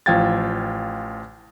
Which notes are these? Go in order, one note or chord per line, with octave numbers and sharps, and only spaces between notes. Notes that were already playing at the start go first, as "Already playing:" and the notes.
A1 F3 F5 G5 G#6 A6